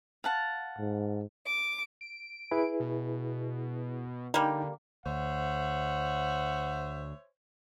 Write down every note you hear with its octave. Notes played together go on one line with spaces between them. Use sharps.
F5 F#5 A5
G#2
D6
D7
E4 G#4 B4
B2
D3 G3 A#3 D#4 G5
D2 C5 C#5 E5 F#5